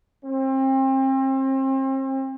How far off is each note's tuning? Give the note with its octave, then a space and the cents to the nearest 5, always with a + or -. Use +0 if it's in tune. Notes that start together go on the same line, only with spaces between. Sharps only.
C4 +35